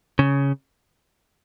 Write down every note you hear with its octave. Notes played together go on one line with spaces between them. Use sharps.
C#3